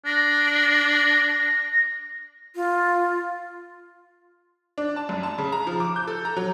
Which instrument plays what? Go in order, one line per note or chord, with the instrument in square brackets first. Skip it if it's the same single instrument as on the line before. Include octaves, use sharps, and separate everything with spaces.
[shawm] D4 [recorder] A#6
[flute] F4
[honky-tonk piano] D4
A5
F#2
A5
C#3
A#5
F3
D6
G6
A4
A#5
F#3